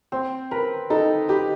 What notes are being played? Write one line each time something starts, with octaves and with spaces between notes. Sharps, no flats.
C4 C5
A#4 B4
D#4 A4
G4 B4